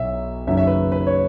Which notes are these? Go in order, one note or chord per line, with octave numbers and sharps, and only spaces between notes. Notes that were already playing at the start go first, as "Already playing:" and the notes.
Already playing: B1 B2 F#3 E5
F#1 F#2 D#3 F#3 E5
E5
B4
B4
C#5